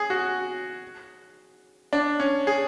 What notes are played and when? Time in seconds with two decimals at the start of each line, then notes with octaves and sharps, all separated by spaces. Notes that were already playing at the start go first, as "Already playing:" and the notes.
Already playing: G#4
0.10 F#4
1.93 D4
2.20 C#4
2.47 G#4